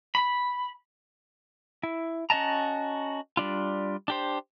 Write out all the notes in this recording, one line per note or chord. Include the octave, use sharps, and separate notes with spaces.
B5
E4
C#4 F#4 D#5 A5 A#5
G3 D4 F4
D4 G4 C5